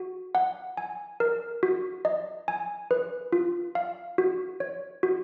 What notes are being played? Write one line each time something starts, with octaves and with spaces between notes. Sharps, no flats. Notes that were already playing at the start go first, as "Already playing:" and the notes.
Already playing: F#4
F#5
G#5
A#4
F#4
D#5
G#5
B4
F4
F5
F#4
C#5
F#4